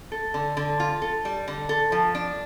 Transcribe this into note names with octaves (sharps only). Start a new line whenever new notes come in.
A4
D3
D3
F4
A4
G3
D3
A4
F3
D4